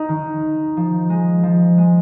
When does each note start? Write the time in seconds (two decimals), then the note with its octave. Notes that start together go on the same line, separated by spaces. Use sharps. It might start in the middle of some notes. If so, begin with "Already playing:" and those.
Already playing: D#4
0.09 D#3
0.77 F3
1.10 G#3
1.43 F3
1.78 G#3